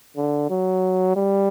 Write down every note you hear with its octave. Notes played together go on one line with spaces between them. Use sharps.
D3
F#3
G3